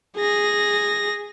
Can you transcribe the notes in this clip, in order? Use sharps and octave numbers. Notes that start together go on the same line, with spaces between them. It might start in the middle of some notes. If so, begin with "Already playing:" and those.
G#4 A#6